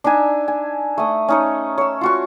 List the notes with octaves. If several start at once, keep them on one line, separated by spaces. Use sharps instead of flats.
D4 D#4 E5 G#5
G#5
A3 D#6
C#4 D#4 C#5
C#5 E6
F4 F#4 C#6